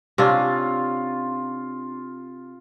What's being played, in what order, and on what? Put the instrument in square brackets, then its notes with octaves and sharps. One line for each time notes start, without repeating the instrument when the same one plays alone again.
[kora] C3 C#4 D4 [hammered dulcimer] F4